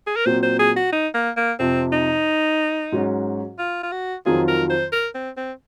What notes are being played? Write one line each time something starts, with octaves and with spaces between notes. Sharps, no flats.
G#4
A#4
A#2 F#3 C4 C5
C5
G#4
F#4
D#4
A#3
A#3
F2 C3 F3 C4
D#4
G#2 F#3 C#4 F#4
F4
F4
F#4
F2 D#3 F#3 C4 F4 G#4
A#4
C5
A#4
C4
C4